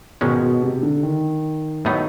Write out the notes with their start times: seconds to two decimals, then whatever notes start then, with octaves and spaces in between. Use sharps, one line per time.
0.21 G#2 B2 D#3 G#3 C#4
0.41 B2
0.62 C3
0.82 D3
1.03 D#3
1.85 A2 F#3 B3 D#4